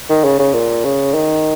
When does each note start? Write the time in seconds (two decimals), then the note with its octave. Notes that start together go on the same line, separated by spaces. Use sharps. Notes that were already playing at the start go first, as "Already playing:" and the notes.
0.09 D#3
0.24 C#3
0.39 C#3
0.53 A#2
0.84 C#3
1.14 D#3